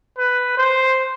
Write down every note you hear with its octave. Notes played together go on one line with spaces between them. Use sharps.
B4
C5